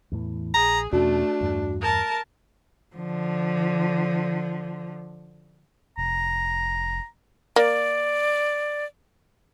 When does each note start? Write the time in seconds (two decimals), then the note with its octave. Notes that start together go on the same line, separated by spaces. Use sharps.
0.12 E2 A2 E3
0.54 A#1 G#4 A#5
0.93 E2 B2 A3 C#4 D4 F#4
1.41 E2 G2
1.81 A#4 A5
2.95 D3 F3
5.98 F1 A#5
7.56 A#3 D5